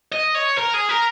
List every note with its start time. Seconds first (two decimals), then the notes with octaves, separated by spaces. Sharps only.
0.12 D#5
0.35 C#5
0.58 A#4
0.74 G#4
0.90 A#4